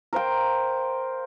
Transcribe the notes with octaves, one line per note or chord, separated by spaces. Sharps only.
A#4 C5 F5 G5